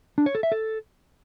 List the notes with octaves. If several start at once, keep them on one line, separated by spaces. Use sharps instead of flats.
D4
C#5
A4
E5
A4